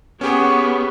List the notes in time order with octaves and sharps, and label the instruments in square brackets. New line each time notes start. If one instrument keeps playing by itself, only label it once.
[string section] B3 [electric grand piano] C#4 G4 G#4 [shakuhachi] C#6